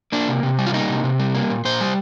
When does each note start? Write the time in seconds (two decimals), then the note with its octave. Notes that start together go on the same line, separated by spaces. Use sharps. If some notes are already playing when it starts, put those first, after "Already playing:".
0.12 A#3 D4
0.28 C3
0.43 C3
0.59 G3
0.66 F4
0.74 A#3 D#4
0.89 C3
1.04 C3
1.20 G3
1.35 A#3
1.50 A#2
1.65 A#2 C5
1.80 G3